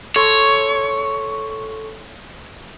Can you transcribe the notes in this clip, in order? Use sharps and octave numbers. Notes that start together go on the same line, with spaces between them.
A4 C#5 C6 C#6